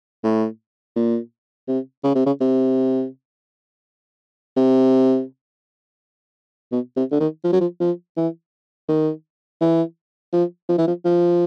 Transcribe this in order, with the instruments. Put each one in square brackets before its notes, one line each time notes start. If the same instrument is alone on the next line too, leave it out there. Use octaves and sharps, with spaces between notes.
[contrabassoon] A2
A#2
C3
C#3
C3
C#3
C3
C3
B2
C3
D3
D#3
F3
F#3
F3
F3
E3
D#3
E3
F3
F3
E3
F3
F3